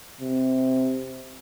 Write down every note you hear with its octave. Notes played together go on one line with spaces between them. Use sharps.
C3